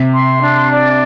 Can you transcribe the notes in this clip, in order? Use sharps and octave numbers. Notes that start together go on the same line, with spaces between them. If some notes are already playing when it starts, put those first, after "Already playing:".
Already playing: C3 E5
C6
D4
D5